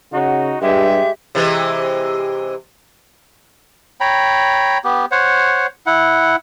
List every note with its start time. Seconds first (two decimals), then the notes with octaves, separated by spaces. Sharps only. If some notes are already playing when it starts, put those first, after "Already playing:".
0.13 C#3 D#4 F#4
0.61 G2 G#3 G4 E5
1.35 C3 E3 G#3
4.00 C#5 G5 A#5 B5
4.84 B3 G4
5.12 C5 C#5 F#5
5.86 E4 F#5